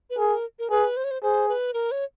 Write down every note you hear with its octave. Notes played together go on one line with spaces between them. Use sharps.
B4
G#4 A#4
A#4
G#4 B4
C5
C#5
C5
G#4 C5
B4
A#4
C#5